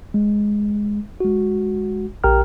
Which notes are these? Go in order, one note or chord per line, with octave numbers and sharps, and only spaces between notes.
G#3
G#3 F#4
A#1 G4 A#4 G5 A#5 F6